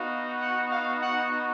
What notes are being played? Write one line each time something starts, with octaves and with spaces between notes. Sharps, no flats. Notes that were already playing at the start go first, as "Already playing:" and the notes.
Already playing: B3 D#4 F#4 F5
F#5
F5
F#5